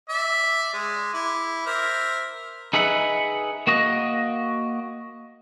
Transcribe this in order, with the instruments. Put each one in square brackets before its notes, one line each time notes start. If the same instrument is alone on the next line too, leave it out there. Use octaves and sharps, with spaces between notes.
[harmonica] D5 E5
G#3
E4 D6
A#4 C5 E5
[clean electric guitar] D#4 G#4 B4 E5 F#5
A#3 F#4 D#5